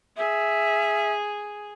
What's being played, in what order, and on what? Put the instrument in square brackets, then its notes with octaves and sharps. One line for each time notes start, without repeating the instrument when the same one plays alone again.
[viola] G#4 [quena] E5